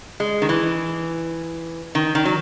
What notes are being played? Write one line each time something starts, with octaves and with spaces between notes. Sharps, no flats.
G#3
D#3
E3
D#3
D#3
F#3